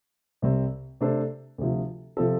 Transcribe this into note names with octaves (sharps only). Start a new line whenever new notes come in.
C2 C3 G3 C4
C3 A3 D4 A4 C5
D2 C3 F3
C3 F3 C4 A4